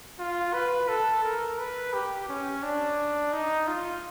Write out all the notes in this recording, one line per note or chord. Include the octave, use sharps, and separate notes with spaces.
F4
B4
A4
A#4
B4
G4
C#4
D4
D#4
F4